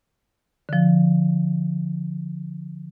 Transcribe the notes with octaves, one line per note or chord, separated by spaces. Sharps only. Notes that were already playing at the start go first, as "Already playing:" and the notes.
D3 F3